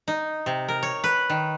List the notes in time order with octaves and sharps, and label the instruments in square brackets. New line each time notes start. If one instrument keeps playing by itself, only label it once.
[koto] D#4
C3
A#4
C#5
B4
D#3